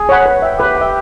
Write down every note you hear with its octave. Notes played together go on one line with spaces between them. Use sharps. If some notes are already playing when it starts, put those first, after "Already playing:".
Already playing: G#4
C#5 F#5 B5
B4
E5 G5
G4 B4
E5 G5